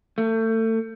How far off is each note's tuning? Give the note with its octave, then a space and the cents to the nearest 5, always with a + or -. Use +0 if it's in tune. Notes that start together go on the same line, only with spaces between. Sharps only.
A3 +30